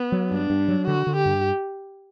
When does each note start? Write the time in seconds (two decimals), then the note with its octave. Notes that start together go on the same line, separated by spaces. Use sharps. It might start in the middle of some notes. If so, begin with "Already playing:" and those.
Already playing: B3
0.12 F#3
0.31 G2 D4
0.50 G2
0.68 F#3
0.87 D3 F#4
1.07 D3
1.16 G4
1.25 G2